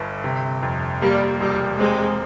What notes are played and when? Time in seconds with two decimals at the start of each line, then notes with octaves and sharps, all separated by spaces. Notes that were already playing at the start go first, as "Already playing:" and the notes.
Already playing: G1 G2
0.24 C3
0.63 F2
1.02 G3 A#3
1.41 E1 G3
1.80 G#3 C4